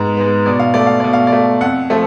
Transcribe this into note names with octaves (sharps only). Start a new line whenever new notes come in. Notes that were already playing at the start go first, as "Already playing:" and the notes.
Already playing: G#2 G#3 B3
G#3 B3
B2 D5
F5
A3 D5
F5
B2 D5
F5
D5
A3
F2 F#5
F3 A3